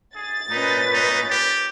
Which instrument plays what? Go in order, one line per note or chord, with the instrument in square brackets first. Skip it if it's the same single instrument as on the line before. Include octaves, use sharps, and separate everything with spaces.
[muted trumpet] G#4 [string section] A6
[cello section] A#2 C#4 B4 [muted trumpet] D#4
[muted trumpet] D#4
G4